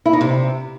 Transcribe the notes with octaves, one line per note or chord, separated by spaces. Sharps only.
E4
D#4
C3